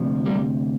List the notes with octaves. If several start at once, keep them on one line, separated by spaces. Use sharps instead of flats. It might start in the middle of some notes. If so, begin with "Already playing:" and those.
Already playing: D2 C3 F3
G3 A#3